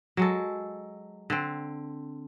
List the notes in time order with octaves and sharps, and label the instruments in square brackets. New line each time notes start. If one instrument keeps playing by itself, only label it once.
[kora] F#3 G#3 A4
D3 C4